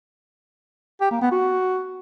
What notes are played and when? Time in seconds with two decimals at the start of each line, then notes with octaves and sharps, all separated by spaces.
1.01 G4
1.11 A#3
1.21 B3
1.31 F#4